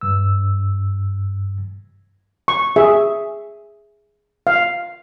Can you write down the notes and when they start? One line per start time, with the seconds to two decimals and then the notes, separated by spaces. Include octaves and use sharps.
0.01 G2 E6
2.48 C#6
2.76 G#4 E5
4.47 F5